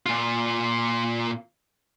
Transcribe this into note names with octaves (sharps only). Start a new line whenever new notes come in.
A#2 F4